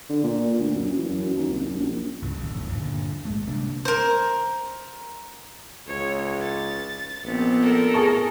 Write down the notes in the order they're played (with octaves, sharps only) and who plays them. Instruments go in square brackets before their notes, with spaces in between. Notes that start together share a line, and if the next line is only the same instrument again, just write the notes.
[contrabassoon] D3
A#2
D2
F#2
E3
F#2
D#2
C2
F#2
A#1
[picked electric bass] C#2 G2 A#2 C#3
D1 A#1 D#2
G2 A#2 D3
G#1 E2 G#3 A3
C3 G3 A#3 D4
[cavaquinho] A#4 C5
[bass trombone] C#2 [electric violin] C#5
[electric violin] A6
[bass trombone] A#1 [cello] B3 C4
[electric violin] A4 A#4
[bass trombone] A2 [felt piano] G#4 A5 C#6